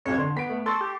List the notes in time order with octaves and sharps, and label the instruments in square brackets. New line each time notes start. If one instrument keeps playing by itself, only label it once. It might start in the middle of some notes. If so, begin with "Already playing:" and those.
[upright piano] B1 F2 [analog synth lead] C#5
[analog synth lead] D3 [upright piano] C6
[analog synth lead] B3 [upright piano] B6 D7
[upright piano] A3
[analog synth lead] A4 [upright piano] C6 C#6 A6
[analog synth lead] G4